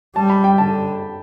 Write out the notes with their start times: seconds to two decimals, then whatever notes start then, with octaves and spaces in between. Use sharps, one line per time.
0.15 G3 A5
0.30 B5
0.44 G5
0.58 D3 A5